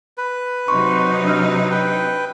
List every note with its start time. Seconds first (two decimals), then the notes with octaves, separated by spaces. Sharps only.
0.18 B4
0.68 C3 F#3 D#4 C6 C#6
1.25 D4 E6 F6
1.71 B4 G5